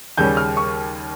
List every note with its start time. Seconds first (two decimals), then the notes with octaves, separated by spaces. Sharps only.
0.17 D#2 C#3 G3 C#4 G6
0.37 F6
0.57 C#6